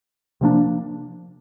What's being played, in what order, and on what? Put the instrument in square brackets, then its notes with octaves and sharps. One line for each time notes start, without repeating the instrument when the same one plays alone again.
[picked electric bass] C3 F3 A#3 D4